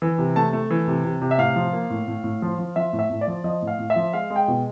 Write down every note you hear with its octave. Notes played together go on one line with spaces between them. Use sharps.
E3
C3
A3 A5
A3
E3
C3
C3
C3
E5
A2 F5
F3
A#3
A2
A2
A2
F3
F3
F3 E5
A2
E5
A2
D5
F3
F3 D#5
A2
F5
A2
E5
F3
G#3 F5
G#3
G5
B2